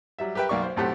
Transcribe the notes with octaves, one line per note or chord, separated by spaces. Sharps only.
F#3 G3 E5
G4 A#4 B4 E5 G5
B1 A#3 D5 C#6
C5
B1 A2 A3 C4 G4 F#5